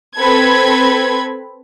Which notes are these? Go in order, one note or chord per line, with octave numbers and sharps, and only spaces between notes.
C4 A4 B4 B5 G#6